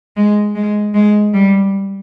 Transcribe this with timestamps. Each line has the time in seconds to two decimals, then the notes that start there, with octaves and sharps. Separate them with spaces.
0.17 G#3
0.56 G#3
0.94 G#3
1.34 G3